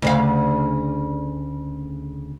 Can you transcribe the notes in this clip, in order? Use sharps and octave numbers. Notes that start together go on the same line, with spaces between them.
D2 C#3 F5